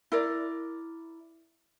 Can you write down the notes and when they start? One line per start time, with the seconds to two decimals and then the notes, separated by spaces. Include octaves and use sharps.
0.12 E4 A#4 D5